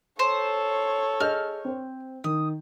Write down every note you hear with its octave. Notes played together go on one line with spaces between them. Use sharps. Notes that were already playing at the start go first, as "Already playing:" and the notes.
A4 C5 C#5
G#4 D#5 F6 G6
C4 C5
D#3 D#6